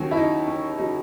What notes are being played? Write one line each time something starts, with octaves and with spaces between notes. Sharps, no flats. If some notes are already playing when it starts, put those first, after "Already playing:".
Already playing: D#2 C#3 F#3 C#4
E4
D#4
C#4
C#3 F#3 D#4